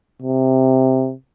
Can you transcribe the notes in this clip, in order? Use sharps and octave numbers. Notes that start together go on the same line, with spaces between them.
C3